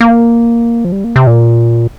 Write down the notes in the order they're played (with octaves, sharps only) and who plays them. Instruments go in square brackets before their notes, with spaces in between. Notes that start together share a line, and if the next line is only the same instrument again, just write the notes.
[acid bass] A#3
F3
G3
A#3
C3
A#2